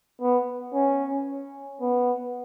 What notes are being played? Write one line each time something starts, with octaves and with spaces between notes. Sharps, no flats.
B3
C#4
B3